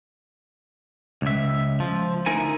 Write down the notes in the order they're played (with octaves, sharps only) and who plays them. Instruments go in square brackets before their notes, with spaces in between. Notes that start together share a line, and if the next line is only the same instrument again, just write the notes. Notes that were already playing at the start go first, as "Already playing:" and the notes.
[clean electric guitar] C#2 E5
F3
D2 D#4 E4 A#4 G#5